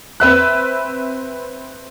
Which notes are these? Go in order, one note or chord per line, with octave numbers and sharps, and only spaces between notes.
C4 B4 E5 F#6